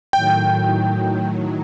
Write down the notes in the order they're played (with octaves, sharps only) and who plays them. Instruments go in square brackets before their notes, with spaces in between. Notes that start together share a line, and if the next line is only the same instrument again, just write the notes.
[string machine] A2 D#3 F#3 [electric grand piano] G5